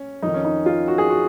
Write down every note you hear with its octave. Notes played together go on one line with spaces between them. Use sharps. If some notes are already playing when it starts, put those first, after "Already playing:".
Already playing: C#4
F2 D#3 D#4
C#4
D#4
F4
F#4
G#4
F#4